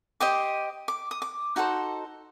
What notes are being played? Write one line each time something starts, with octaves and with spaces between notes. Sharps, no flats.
G4 C5 D#5 D6
D6
D#6
D6
D#4 F#4 A4 C5